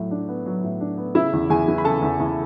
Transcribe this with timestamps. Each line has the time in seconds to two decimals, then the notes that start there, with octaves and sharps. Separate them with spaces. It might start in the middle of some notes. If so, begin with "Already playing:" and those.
Already playing: A2 F#3
0.11 D4
0.29 B3
0.46 F#3
0.64 A2
0.81 D4
0.98 B3
1.15 C#3 E4 E5
1.33 E2
1.50 E2 G#4 G#5
1.68 E3
1.78 B5
1.85 C#3 A4 A5
2.02 E2
2.20 E2